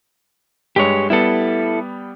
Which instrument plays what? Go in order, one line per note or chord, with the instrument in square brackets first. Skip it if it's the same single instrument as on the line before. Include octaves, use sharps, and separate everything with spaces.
[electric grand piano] G2 G#3 [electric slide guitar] G4 C#5
[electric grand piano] G3 B3 [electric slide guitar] E4 A4